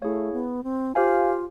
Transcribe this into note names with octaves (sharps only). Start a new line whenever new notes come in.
A3 E4 G#4 C#5 F5
B3
C4
F4 G4 C5 F5 G#5